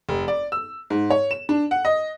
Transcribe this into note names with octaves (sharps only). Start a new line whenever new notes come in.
F1
D5
E6
G#2
C#5
E7
D4
F#5
D#5